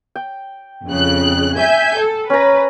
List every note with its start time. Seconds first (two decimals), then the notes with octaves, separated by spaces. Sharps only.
0.16 G5
0.88 F2 C#3 F#6
1.57 E5 G#5 G6
1.97 A4
2.30 C#4 B4 A#5